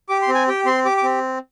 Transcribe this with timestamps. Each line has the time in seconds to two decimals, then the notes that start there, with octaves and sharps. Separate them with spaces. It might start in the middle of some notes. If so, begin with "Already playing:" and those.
0.09 G4 D6
0.22 C6
0.28 C4
0.35 G#5
0.48 G4 G5
0.66 C4 C6
0.85 G4 D6
0.98 D6
1.03 C4